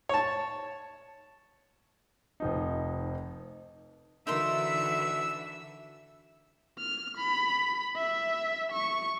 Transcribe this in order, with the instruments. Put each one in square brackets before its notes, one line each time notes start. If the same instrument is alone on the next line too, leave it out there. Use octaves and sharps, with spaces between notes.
[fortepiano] C#5 A5
[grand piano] F1 F3 D#4
[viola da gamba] D3 F#4 [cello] E3 E5 [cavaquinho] D#4 A#4 C6 [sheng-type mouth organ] E6
[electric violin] F6
B5
E5
C#6